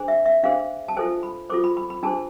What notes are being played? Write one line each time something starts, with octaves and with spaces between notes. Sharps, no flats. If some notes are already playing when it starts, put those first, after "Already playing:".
Already playing: D4 G#4 C5
E5
E5
D4 G#4 C5 F5
A5
F4 A4 C5 G#5
B5
F4 A4 C5 D6
B5
B5
B5
D4 G#4 C5 A5